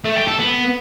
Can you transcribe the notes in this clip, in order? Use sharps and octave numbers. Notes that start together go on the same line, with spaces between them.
A3
G4
A4
B3